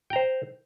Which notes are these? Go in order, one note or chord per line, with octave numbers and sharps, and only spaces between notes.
C5 G5 A#5